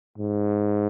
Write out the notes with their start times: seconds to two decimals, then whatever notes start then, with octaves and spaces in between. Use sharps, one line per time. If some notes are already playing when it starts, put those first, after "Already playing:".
0.18 G#2